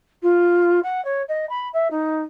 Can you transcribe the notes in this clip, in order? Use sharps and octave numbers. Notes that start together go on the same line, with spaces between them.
F4
F#5
C#5
D#5
B5
E5
D#4